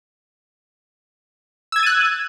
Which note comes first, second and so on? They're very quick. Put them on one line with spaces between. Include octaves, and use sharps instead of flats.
E6 G#6 A6 D#7 F#6